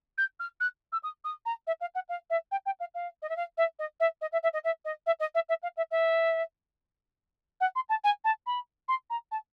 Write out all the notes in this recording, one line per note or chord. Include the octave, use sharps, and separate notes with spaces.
G6
F6
F#6
E6
D#6
D#6
A#5
E5
F5
F#5
F5
E5
G5
G5
F5
F5
D#5
E5
F5
E5
D#5
E5
D#5
E5
E5
D#5
E5
D#5
E5
D#5
E5
E5
F5
E5
E5
F#5
C6
A5
G#5
A5
B5
C6
A#5
A5